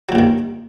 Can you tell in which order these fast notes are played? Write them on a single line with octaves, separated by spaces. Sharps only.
F#3 A#2 G2 D#3